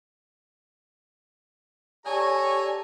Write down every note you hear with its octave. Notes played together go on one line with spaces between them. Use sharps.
G4 A4 C#5 D5 G#5 A#5